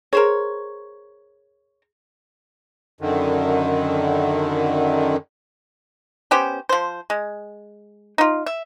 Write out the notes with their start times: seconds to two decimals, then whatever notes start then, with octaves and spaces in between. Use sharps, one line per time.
0.13 G#4 A#4 C5 C#5
3.01 F#2 D3 D#3
6.31 B3 C#4 G4 C5
6.69 F3 C5
7.10 G#3
8.18 D#4 F4
8.46 E5